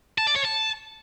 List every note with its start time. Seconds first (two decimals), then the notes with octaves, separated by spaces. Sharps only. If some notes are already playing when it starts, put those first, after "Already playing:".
0.18 A5
0.27 D5
0.36 C#5
0.45 A5